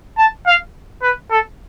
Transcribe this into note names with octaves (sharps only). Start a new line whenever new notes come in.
A5
F5
B4
A4